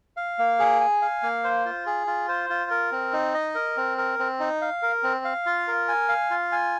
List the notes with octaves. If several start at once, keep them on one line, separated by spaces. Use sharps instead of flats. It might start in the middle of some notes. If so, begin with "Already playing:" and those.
F5
A#3
G#4
G#5
F5
A#3
C5
F4
G#4
F4
C5
F4
A#4
C4
D#4
D#5
A#4
C4
A#4
C4
D#4
F5
A#4
C4
F5
F4
A#4
G#5
F5
F4
G#5